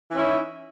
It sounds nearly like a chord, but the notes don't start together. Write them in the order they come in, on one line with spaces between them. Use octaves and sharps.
E3 C#4 E4 D#4